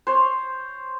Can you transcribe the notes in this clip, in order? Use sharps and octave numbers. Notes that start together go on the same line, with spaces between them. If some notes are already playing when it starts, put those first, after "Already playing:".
C5 C#5